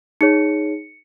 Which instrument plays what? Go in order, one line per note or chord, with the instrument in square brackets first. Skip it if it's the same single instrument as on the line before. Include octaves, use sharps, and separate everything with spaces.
[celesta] D#4 G#4 C#5 C#7